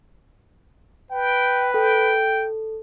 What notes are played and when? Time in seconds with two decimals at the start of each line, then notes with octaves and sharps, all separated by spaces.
1.11 B4 G5
1.74 A4 G5